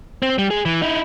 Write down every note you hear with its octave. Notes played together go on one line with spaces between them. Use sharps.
C4
G3
G#3 G#4
E3
D#4 E4